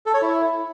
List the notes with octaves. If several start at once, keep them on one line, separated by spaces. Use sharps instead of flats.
A4
C#5
E4